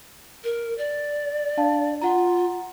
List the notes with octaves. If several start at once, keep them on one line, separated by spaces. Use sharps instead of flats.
A#4
D5
D4 F5 A5
F4 F#5 A#5